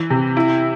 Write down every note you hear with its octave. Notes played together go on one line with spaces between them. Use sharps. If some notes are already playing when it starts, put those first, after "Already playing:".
Already playing: E3
C3
E4